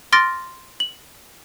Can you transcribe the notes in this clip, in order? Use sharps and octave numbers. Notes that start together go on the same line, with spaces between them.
C6 D6 F6 A6 A#6 D7
F#7